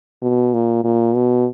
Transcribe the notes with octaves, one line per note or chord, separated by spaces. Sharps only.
B2
A#2
A#2
B2